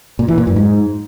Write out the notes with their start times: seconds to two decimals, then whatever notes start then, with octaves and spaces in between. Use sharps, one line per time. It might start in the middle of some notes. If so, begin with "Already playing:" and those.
0.19 A#2
0.28 E3
0.38 A#2
0.47 F#2
0.56 G#2